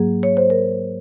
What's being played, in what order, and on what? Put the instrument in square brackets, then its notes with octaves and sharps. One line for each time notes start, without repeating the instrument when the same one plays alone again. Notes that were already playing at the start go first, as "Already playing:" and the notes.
Already playing: [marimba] G#2 F#3 A#3 G#4
C#5
C5
A#4